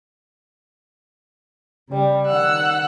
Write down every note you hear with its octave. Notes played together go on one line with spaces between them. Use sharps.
C#3 G3
D#3 F#5 E6 F#6